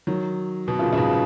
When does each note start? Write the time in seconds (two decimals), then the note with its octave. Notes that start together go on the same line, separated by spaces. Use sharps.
0.07 D#3 F#3
0.68 B2
0.79 A#2 C#3
0.93 C#3
0.98 G#2 B2